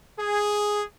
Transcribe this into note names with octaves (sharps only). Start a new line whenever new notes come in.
G#4